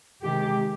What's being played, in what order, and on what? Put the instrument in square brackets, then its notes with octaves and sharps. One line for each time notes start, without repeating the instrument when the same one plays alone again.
[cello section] C3 D#3 G#3 G4